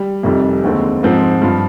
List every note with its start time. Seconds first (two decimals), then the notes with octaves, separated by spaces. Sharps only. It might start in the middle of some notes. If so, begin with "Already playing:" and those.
Already playing: G3
0.23 F1 F2 C3 D#3 G3
0.64 D#2 D3 G#3 C4
1.03 G#2 F3 C4
1.42 G2 F3